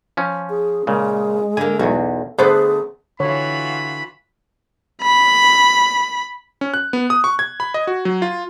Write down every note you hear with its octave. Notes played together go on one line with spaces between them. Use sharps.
F3 C#4
G#4
A#2 C#3 G#3
D3 A#3 G#5
B1 E2 F#4
D3 A3 B3 G#4 B4 C5
D3 E3 F4 F#4 C#5 B5
B5
C#4
F#6
B3
D#6
C#6
G#6
B5
D#5
F#4
F#3
F4